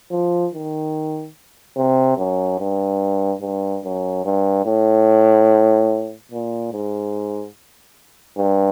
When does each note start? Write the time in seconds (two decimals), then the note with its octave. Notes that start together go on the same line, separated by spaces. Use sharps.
0.11 F3
0.54 D#3
1.77 C3
2.18 F#2
2.59 G2
3.41 G2
3.84 F#2
4.25 G2
4.65 A2
6.31 A#2
6.72 G#2
8.37 G2